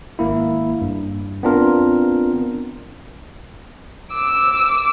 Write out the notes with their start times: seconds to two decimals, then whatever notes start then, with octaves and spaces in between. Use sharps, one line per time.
0.19 G#1 A#3 E4
0.81 G2
1.43 B3 C4 D4 F4 A#4
4.14 D6 E6